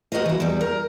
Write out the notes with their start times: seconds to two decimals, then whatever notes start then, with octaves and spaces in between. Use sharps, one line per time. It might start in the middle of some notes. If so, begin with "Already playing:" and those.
0.12 F#4 G4 A#4 C5 D#5
0.25 E3 E4
0.40 E2 G3
0.61 A#4